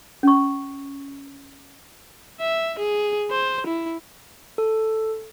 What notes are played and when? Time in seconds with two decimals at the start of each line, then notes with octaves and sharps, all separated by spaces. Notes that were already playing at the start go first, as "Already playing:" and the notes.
0.23 C#4 C#6
2.41 E5
2.79 G#4
3.31 C5
3.67 E4
4.58 A4